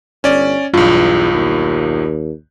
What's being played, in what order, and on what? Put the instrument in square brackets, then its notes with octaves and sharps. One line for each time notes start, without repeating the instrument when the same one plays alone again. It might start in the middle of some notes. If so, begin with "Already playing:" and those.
[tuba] G1 [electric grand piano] C#4 D5
[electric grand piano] B1 G2 [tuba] E2 [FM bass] F4
[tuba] D#2